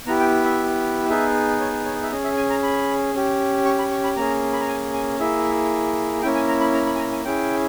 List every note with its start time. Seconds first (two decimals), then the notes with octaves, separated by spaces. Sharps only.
0.06 B3 E4 G4 A#5
0.20 G5
0.44 E5
1.09 B3 D#4 G#4 E5
1.60 C#5
1.85 C#5
2.03 E5
2.11 C#4 G#4 D#5
2.24 E5
2.37 G#5
2.50 A#5
2.63 B5
3.14 C#4 G4
3.65 C#6
3.78 B5
3.91 C#6
4.04 B5
4.16 A#3 C#4 G#4 A#5
4.53 B5
4.61 A#5
4.68 G#5
4.94 G#5
5.19 A#3 E4 G#4 E5
6.22 A#3 C#4 E4 G5
6.35 G#5
6.48 A#5
6.60 B5
6.74 A#5
6.86 B5
6.95 G#5
6.99 A#5
7.12 G#5
7.24 C#4 E4 G#4 G5